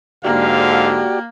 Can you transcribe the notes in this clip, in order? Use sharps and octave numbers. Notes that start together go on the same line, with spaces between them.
G#2 D3 A#3 F#4 G4 D5 F5